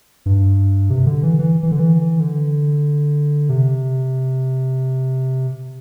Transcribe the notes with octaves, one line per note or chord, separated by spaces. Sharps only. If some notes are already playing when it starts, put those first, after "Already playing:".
G2
C3
D3
E3
E3
E3
D3
E3
D3
C3